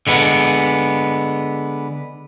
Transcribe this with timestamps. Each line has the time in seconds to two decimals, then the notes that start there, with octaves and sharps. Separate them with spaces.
0.07 D3 G#3 B3